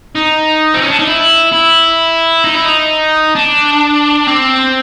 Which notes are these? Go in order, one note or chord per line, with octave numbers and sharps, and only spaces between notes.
D#4
C4
C#4
D4
D#4
E4
E4
D#4
E4
D#4
D4
C4